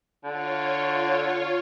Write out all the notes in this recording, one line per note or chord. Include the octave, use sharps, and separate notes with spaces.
D3 F4 C#5